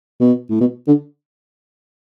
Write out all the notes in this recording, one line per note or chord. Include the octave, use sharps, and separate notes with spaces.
B2
A2
B2
D3